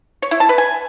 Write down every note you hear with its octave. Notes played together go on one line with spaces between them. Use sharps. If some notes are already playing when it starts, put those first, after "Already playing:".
C#5
E4
A5
B4
G#5